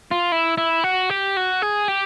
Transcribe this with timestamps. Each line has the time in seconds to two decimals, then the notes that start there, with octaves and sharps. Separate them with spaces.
0.11 F4
0.32 E4
0.58 E4
0.84 F#4
1.10 G4
1.37 F#4
1.62 G#4
1.88 G4